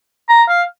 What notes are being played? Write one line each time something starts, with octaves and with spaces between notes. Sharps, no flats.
A#5
F5